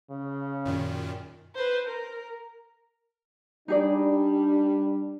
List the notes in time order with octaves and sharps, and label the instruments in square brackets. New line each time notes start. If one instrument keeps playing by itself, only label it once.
[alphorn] C#3
[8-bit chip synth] F#2 A#2 D#3
[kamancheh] B4 C5
A#4
[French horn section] G3 D4 [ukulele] D#4 G#4 D5